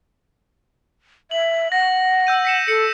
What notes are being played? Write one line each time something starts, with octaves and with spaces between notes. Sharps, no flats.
E5 F#7
F#5 A#6
E6 G6 D#7
B6 C#7 E7
A4 C#7